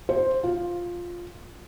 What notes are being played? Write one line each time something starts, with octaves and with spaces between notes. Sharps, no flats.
C5
F4